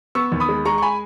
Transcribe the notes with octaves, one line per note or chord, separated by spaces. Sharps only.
B3 C#6 E6
D#2
B5 D#6
G#3
G#3 A#5 C#6
C#6
G#5 B5